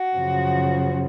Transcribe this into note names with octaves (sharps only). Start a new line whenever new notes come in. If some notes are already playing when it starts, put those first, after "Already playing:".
Already playing: F#4
F#2 C#3 F3